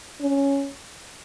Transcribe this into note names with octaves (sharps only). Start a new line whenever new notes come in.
C#4